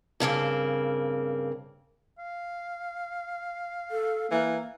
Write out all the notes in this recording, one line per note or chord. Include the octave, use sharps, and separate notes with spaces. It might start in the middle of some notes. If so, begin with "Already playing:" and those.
G2 C#3 A#3 C4
F5
A4
E3 A#3